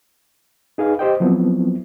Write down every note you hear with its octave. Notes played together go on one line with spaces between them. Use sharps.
D#4 G#4 B4 F5
G4 C5 D#5 G5
F3 F#3 B3 C4 E4